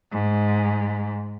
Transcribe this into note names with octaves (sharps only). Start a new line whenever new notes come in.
G#2